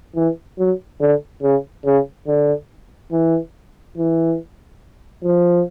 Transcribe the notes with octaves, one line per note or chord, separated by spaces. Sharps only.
E3
F#3
D3
C#3
C#3
D3
E3
E3
F3